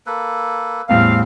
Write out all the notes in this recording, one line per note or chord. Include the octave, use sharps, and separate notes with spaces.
A#3 A4 B4
E2 A2 G3 C4 F5